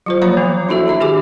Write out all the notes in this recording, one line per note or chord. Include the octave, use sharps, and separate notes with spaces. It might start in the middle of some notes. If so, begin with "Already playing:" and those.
F#3 F4 C5
F3 A#3 C#5 F5 A#5 B5
E3 B3
D4 E4 F#4 A4 E5
D4 E5 A#5
D#3 G4 G#4 G#5 D6